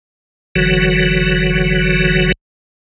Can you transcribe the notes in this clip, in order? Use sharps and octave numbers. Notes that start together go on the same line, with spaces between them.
F#1 D3 E3 F#3 F#4